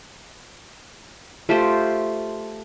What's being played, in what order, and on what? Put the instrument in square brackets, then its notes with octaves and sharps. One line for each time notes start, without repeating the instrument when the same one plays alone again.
[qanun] A3 F4 G4 C5